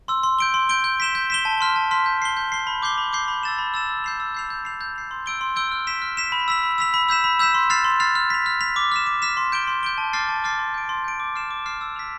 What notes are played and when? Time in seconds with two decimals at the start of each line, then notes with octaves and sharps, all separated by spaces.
0.08 C6 E6
0.23 C6
0.39 G6 D7 G7
0.54 C6
0.69 G6 D7 G7
0.84 G6
1.00 B6 E7 G7
1.15 G6
1.30 B6 E7 G7
1.45 A5
1.61 C6 F6 B6
1.76 A5
1.91 C6 F6 B6
2.06 G6
2.22 C7 G7
2.37 G6
2.52 C7 G7
2.67 B5
2.82 D6 G6 C7 G7
2.98 B5
3.13 D6 G6 C7 G7
3.28 B5
3.43 E6 A6 E7
3.58 B5
3.74 E6 A6 E7
3.89 E6
4.04 G6 C7 F7
4.20 E6
4.35 G6 C7 F7
4.50 G6
4.65 C7 F7
4.81 G6
4.96 C7 F7
5.11 C6
5.26 E6 G6 D7 G7
5.41 C6
5.56 E6 G6 D7 G7
5.71 F6
5.87 B6 E7
6.02 F6
6.17 B6 E7
6.32 B5
6.48 E6 B6 F7
6.63 B5
6.78 E6 B6 F7
6.94 B5
7.09 E6 G6 B6 E7
7.24 B5
7.39 E6 G6 B6 E7
7.54 C6
7.70 F6 A6 C7 F7
7.85 C6
8.00 F6 A6 C7 F7
8.15 F6
8.30 B6 F7
8.46 F6
8.61 B6 F7
8.76 D6
8.92 F6 B6 E7
9.07 D6
9.22 F6 B6 E7
9.37 C6
9.52 G6 D7 G7
9.67 C6
9.83 G6 D7 G7
9.98 A5
10.13 D6 F6 A6 C7
10.29 A5
10.44 D6 F6 A6 C7
10.59 C6
10.74 G6 D7
10.89 C6
11.04 G6 D7
11.20 D6
11.36 F6 C7 E7
11.51 D6
11.66 F6 C7 E7
11.81 E6
11.96 B6 F7